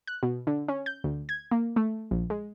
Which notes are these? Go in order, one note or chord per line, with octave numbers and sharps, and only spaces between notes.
F#6
B2
D3
C#4
G6
D2
G#6
A#3
A3
A#1
G#3